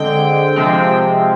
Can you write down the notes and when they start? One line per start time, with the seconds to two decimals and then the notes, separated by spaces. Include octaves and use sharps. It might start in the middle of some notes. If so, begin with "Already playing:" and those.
Already playing: D3 G#3 C4 G5
0.56 C3 F3 G#3 C4